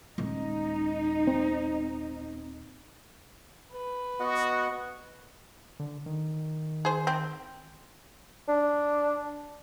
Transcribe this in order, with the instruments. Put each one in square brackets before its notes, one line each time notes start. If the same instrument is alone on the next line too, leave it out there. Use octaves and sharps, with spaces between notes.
[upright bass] D#1 G#3 [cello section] D#4
[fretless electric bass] C4
[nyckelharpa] B4
[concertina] B3 D#5 F#5 [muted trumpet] F#4
[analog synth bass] D3
D#3
[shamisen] G#4 C5
C4
[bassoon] D4